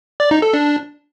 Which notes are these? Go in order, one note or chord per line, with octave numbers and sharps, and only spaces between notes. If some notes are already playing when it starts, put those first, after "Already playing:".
D5
D#4
A4
D4